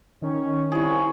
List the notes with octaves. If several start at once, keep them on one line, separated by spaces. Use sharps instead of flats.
D#3 C#4
C2 E4 G#4 C#5